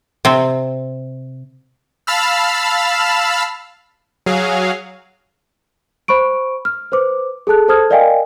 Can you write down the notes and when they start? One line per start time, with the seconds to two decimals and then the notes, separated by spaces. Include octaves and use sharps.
0.25 C3 C4
2.07 F5 A5 B5 E6 F6
4.26 F#3 G#4 F5
6.08 C5 B5 C#6 D7
6.65 F6
6.92 B4 C5 D6
7.47 G#4 A4 A5 F#6
7.68 A4 C5 A5 D#6 F6 G#6
7.90 A#4 D5 D#5 F5 G5 G#5